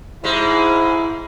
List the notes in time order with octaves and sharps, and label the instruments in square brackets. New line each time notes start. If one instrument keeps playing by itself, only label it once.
[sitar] G#2 G#3 [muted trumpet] E4